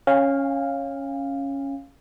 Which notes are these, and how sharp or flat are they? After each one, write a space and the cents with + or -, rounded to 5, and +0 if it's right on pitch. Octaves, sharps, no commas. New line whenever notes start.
C#4 -5 F5 +0 G#5 -40